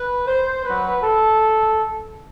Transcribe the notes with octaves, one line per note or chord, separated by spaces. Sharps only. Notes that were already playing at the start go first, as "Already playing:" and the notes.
Already playing: B4
C5
F#2 F#3 B4
A4